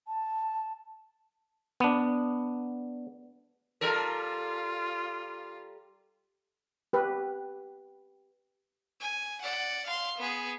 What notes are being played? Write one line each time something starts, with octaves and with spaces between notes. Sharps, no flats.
A5
B3 D4
G3 F4 A4 A#4
G4 B4
G#5
D5 F#5
F5 C6
B3 G#4